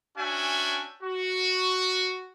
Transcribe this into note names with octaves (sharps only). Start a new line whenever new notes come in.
C#4 D4 F#4 E5 G5 G#5
F#4